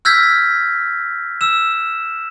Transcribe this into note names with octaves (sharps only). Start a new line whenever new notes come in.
E6 F6 G6 G#6 A#6 B6
E6 E7